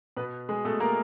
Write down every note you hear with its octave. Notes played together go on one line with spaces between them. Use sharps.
B2 B3 B4
G#3 G#4
B2 A3 A4
A#3 A#4